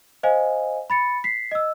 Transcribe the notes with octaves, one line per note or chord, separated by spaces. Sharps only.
C5 D#5 F5 G#5
B5 A6 C#7
B6 C7
D#5 E6